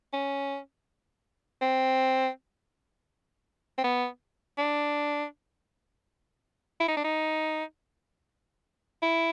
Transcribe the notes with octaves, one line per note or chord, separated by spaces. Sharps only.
C#4
C4
C4
B3
D4
E4
D#4
D4
D#4
E4